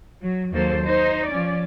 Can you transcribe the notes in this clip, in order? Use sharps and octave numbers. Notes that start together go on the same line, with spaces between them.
F#3
D#2 F#3 A#3 A4 C5
D#4 C5
F3 C#4 D5